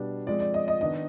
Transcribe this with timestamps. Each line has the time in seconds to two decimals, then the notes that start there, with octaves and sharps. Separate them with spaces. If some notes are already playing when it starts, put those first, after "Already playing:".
Already playing: B2 G3 B3 D4
0.27 F3 G#3 C4 D5
0.40 D5
0.54 D#5
0.68 D#5
0.81 D#3 B3 D4 D#5